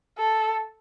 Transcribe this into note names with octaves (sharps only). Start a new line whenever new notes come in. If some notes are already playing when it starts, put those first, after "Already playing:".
A4